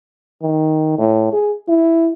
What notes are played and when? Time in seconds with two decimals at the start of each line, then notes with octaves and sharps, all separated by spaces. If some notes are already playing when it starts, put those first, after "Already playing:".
0.43 D#3
0.98 A2
1.33 G#4
1.69 E4